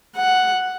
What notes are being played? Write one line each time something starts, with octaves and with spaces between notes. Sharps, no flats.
F#5